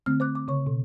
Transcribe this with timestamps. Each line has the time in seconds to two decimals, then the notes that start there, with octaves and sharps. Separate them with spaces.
0.06 D3 A3 C4 F6
0.20 C5 D6 F#6
0.35 D6
0.48 C#3 C#5 C#6
0.67 B2